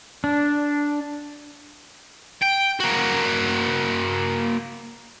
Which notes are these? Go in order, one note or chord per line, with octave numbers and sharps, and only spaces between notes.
D4
G5
A#3 F#4